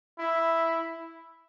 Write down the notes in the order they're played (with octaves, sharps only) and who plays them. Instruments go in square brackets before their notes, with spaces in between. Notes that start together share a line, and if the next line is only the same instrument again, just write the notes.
[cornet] E4